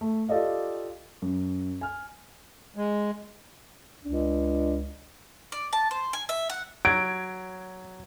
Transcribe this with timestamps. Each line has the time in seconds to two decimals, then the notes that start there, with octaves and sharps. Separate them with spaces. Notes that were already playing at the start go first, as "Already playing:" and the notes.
0.01 A3
0.29 F4 G4 A4 D5 D#5 F5
1.22 F#2
1.81 G#5 F6
2.76 G#3
4.05 C#2 D4
5.52 D5
5.73 A5
5.91 C5
6.13 G#5
6.29 E5
6.50 F#5
6.85 F#3 G#6 D7